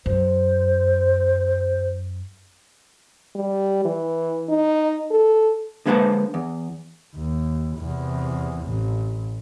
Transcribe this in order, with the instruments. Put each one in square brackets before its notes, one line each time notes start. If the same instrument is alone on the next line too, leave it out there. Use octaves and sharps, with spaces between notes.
[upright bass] F#2 [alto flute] C5
[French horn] G3
E3
D#4
A4
[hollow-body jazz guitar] D3 G#3 A#3 B4 C5 A5
E2
[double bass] D#2
E2 C3
A1